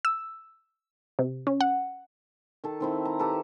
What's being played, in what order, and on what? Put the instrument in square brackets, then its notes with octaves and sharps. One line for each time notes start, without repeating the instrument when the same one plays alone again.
[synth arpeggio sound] E6
C3
C#4
F#5
[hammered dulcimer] D#3 A4
D#3 C4 E4
A#5
G4 A4 B4